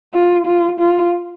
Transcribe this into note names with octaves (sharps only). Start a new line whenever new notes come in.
F4
F4
F4